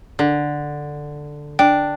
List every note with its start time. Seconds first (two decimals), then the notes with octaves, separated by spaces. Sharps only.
0.19 D3
1.59 D4 G5